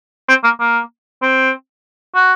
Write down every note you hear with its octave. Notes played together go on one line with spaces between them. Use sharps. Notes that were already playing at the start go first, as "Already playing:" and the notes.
C4
A#3
A#3
C4
F#4